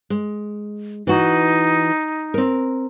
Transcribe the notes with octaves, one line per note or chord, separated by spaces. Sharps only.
G#3
E3 D#4 F#4
C4 A#4